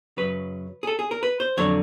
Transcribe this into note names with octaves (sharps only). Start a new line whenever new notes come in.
F#2 C#3 F#3 B4
G#4
A4
G#4
A#4
B4
C5
F2 D3 F#3 C#5